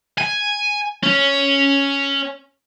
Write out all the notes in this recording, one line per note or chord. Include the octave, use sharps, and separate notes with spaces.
G#5
C#4